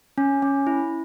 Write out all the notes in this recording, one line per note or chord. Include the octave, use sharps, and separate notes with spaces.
C#4
C#4
E4